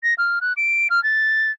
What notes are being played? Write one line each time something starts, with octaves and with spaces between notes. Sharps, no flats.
A#6
F6
F#6
D7
F6
A6